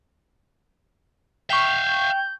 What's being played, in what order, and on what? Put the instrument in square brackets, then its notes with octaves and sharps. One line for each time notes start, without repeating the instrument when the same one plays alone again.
[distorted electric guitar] E5 F5 [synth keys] G5 C#6 [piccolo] G6